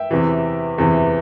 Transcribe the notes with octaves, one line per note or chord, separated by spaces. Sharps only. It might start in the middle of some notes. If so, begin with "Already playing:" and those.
Already playing: E5 G5
E2 C3 E3
E2 C3 E3